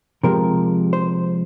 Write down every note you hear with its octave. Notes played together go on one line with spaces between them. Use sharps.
C3 F3 G#3 A#4
C5